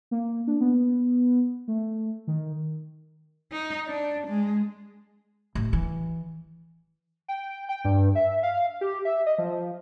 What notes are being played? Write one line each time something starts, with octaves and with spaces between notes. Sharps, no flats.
A#3
D4
B3
A3
D#3
D#4
D4
G#3
A1
E3
G5
G5
G2
E5
F5
G4
E5
D#5
F3